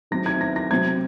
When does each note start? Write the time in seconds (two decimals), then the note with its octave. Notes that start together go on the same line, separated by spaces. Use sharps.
0.11 D#3 F#3 C4 A#6
0.26 G#6
0.41 A#6
0.56 A#6
0.71 C3 F#3 C4 G#6